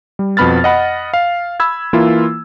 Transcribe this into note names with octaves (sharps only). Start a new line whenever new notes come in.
G3
F2 B2 B3 B5 F6 A6
D#5 F#5 B5
F5
B5 E6 G#6
E3 A#3 E4 F4